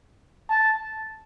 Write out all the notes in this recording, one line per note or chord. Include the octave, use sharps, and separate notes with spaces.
A5